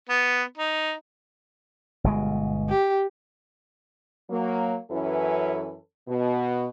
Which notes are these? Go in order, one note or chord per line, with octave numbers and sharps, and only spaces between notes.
B3
D#4
G1 B2 G#3
G4
F#3 A#3
F#2 E3 C#4 E4 A4 B4
B2